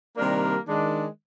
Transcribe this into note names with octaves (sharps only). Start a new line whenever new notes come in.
C3 D#3 G3 A#3 D4 A#4
D#3 G#3 D4